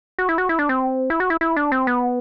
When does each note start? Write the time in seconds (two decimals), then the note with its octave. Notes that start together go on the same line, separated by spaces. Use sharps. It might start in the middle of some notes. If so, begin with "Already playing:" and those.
0.19 F#4
0.29 E4
0.38 F#4
0.49 E4
0.59 D4
0.69 C4
1.10 E4
1.20 F#4
1.30 E4
1.41 E4
1.56 D4
1.72 C4
1.87 B3